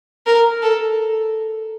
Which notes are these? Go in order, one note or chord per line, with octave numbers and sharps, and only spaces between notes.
A#4
A4